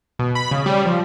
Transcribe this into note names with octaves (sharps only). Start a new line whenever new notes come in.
B2
B5
C#3
G3
F3